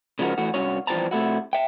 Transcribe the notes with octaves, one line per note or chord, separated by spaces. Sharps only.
C#3 F3 G#3 F4 F#4 A#4
E3 A3 F#4
C2 G2 C#4 F#4 C#5
E3 F3 G3 C4 A5 A#5
C3 A3 E4 F#4
E5 G5